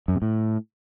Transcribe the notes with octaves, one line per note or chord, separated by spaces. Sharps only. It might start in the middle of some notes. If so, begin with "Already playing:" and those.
F#2
C3
A2